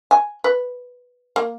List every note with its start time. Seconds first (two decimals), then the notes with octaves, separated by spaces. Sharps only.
0.11 G#5
0.44 B4
1.36 A#3